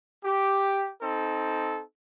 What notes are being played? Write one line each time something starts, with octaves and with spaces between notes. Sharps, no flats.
G4
C4 D#4 A4